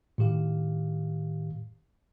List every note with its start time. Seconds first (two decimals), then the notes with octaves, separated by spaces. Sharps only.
0.18 A2 D#3 G4 F5